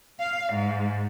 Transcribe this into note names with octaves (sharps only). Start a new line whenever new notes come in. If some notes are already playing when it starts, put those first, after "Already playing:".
F5
G#2